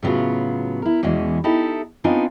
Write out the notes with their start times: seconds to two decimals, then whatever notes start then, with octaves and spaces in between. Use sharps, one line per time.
0.02 A2 C#3 F#3 B3 F4
0.82 E4 A#4
1.03 E2 B2 E3 G#3 C#4
1.44 D#4 E4 G4 A4
2.04 B3 C4 D4 D#4 F4 G#5